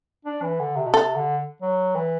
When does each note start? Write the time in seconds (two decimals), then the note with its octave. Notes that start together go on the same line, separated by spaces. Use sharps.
0.25 D4
0.43 E3
0.59 D3
0.76 C3
0.86 B2
0.93 C3 A4
1.16 D3
1.62 F#3
1.95 E3